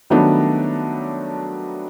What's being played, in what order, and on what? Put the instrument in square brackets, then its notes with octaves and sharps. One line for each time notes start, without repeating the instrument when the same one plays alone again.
[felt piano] D#3 F#3 G3 A3 B3 D4